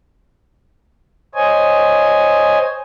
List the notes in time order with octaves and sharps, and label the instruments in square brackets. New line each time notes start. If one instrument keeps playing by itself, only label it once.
[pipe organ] C5 C#5 D#5 G#5